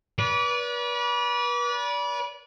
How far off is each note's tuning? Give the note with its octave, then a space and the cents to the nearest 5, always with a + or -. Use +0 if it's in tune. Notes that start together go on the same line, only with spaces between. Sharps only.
B4 -30 D5 -30